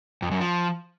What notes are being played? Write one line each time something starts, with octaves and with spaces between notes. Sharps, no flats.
F2
F#2
F3